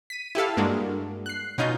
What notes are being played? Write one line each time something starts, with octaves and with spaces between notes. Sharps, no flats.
B6 D#7
E4 G4 A4 F5
G2 G#3 A#3 D4 F#4
F#6 C7
B2 C#4 D#4 F4 G6